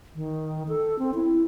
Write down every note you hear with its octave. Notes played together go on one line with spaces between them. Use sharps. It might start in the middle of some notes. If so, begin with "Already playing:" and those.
D#3
A4
C4
E4